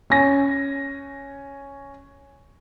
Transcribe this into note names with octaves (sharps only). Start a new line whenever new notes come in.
C#4 G#5 A#6